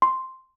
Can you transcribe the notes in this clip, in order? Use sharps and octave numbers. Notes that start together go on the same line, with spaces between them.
C6